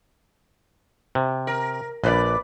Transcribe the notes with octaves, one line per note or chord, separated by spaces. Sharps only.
C3
A#4
A#1 B4 C5 D5